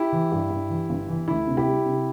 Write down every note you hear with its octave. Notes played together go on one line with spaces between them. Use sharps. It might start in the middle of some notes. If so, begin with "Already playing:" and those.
Already playing: E4 G4
E3
G2
G2
E3
G1
E3
D2 E4
C3
E4 G4
G3
C3